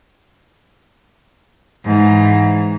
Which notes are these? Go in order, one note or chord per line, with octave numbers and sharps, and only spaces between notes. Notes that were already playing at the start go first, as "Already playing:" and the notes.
G#2 E3